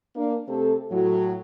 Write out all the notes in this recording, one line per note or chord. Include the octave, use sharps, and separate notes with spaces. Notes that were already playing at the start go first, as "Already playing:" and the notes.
A#3 D4
C3 A3 C4 G4 A4
A2 F#3